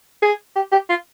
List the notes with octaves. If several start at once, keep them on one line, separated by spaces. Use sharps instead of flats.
G#4
G4
G4
F4